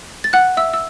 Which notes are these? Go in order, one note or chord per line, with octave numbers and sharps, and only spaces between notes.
A6
F#5 F#6
E5 E6
E6